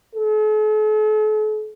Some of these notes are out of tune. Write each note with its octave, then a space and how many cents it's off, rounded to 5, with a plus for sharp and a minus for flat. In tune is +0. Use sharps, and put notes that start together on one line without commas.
A4 -45